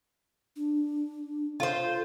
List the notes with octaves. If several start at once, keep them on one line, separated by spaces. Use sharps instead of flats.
D4
F4 A4 C5